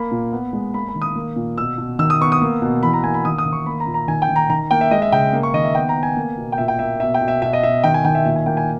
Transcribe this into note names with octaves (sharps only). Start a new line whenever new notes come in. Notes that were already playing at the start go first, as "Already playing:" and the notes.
Already playing: A#3 B5
A#2
B3
G#3
A#3 B5
B5
D#3
D#6
A#3
A#2
B2 E6
B2
D#3 E6
D#6
B3 C#6
D#6
A#3
B2
E3 B5
A#5
A#3 G#5
B5
D#3 D#6
D#6
D#3
C#6
A#3 B5
A#5
A#2
A#5
D#3 G#5
G5
D#3
A#5
D#3 A#5
A#3 G5
E5
G#3 D#5
E5
C#3 G5
A#3
C#6
D#3 D#5
E5
B3 G5
A#5
B3
G#5
A#3
B2
G5
A#2 E5
G5
A#3 E5
B2 E5
G5
B2
E5
B2 E5
D#5
B2 E5
D#3 G5
G#5
D#3 G5
E5
A#2 E5
G#5
A#3 G5
G#5